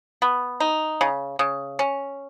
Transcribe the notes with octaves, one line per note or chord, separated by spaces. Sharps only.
B3
D#4
C#3
C#3
C#4